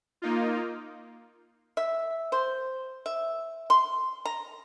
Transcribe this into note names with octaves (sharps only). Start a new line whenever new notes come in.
A#3 D#4 F4
E5
C5
E5
C6
A#5